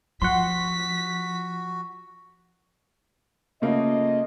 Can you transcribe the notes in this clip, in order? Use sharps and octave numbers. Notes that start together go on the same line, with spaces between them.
F3 F#4 F#5 C6 B6
C#3 A3 A#3 F4 D#5